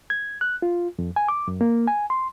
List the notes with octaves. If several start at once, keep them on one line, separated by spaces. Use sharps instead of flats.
G#6
F#6
F4
F2
G#5
D6
F#2
A#3
G#5
C6